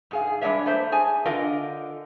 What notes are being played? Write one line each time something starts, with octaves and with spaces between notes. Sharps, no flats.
G#2 G#4 F5
G3 G#3 C4 D4 C#5 E5
A3 A#3 C5
G#4 G#5 A5
D3 F4 A#4 D#5 F5 G5